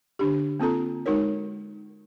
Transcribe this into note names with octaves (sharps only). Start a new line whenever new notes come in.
D3 D4 G4
A#3 C4 F4 A4 A#5
G#3 D#4 F#4 A#4 C#5